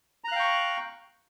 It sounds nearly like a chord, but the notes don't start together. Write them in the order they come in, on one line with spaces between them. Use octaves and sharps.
A#5 F#6 F5 G5 C#6